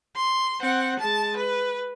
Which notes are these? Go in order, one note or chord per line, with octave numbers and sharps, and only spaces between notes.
C6
C4 F#5
G#3 A5
B4